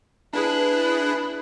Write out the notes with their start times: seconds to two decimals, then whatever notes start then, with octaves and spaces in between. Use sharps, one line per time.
0.33 D4 E4 G#4 B4